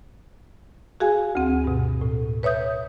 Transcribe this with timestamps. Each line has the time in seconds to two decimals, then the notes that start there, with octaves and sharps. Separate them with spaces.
1.00 F#4 G#4 F5 G#5
1.35 D2 C4
1.64 G2 B2
2.01 A2
2.43 B4 C#5 E5 D#6 G6